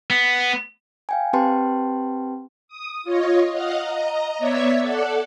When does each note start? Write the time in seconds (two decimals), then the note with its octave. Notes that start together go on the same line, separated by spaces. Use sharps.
0.10 B3
1.09 F5 G5 G#5
1.33 C4 G4 B4 G5 A5 C6
2.68 D#6
3.04 F4 C#5 D#5
3.51 D#5 F5 F#5
3.80 D#5 A#5
4.39 B3 C#5 D5 E5 G#6 B6
4.82 A4 D5 F#5